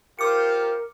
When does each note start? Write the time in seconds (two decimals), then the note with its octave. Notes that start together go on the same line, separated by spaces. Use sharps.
0.19 F4 G4 A#4 C5 D6 C#7